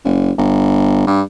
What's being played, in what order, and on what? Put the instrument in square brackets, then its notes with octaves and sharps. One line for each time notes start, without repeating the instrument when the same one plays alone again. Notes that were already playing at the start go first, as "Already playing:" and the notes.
[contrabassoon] F#1
G1
G2